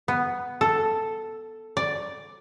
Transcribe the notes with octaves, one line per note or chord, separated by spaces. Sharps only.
B3
A4
D5